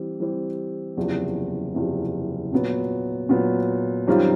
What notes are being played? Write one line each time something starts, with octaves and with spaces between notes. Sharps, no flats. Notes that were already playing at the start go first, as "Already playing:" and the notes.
Already playing: E3 G3 C4
E3 G3 C4
F#1 E2 C3 F3
F#1 E2 C3 F3
A#2 F#3 B3
A#2 F#3 B3
F#2 D#3 G3 C4 F4